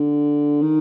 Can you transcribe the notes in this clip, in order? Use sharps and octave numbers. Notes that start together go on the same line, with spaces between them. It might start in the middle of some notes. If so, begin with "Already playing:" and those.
Already playing: D3
D#3